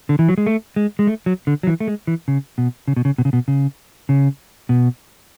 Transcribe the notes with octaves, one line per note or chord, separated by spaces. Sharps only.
D3
E3
F#3
G#3
A3
G#3
G#3
A3
F#3
D3
F#3
E3
A3
G#3
E3
C#3
B2
C#3
B2
C#3
B2
C#3
B2
C#3
C#3
B2